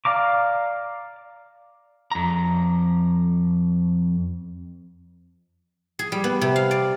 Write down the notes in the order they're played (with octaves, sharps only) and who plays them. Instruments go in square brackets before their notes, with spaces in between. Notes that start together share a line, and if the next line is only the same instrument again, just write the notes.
[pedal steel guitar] D5 F5 A#5 D6
[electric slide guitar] F2 A#5
[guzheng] G#4
G3
B3
C3
F5
D5